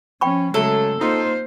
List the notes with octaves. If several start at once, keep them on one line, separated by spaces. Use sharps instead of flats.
F3 C#4 G5 B5 C#6
C#3 F#3 G#3 A3 A4
A#3 C4 D#4 F4 C5